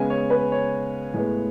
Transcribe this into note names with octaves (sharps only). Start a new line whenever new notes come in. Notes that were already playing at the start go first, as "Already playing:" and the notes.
Already playing: C#3 G#3 B3 G#5
C#5
B4
C#5
A2 G#3 B3